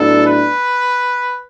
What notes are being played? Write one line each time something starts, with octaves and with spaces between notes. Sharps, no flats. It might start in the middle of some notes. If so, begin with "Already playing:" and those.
Already playing: A2 F#3 B3 D4 A4
B4